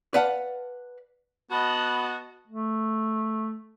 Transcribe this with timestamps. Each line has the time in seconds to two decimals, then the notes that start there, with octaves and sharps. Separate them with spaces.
0.14 B4 D5 F5 F#5 A5
1.51 B3 F#4 D#5 A5 B5
2.48 A3